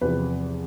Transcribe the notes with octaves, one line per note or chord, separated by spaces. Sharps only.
E2 C3 F3 B4